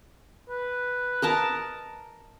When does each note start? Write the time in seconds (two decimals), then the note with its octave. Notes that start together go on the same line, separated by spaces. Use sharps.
0.49 B4
1.22 A#4 D#5 A5